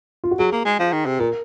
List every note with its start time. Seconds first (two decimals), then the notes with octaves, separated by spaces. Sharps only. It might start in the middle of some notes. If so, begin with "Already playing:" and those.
0.24 F4
0.31 F#4
0.39 F#3 G#4
0.52 A#3
0.65 G#3
0.79 F3
0.92 D#3
1.06 C3
1.19 A#2 A#4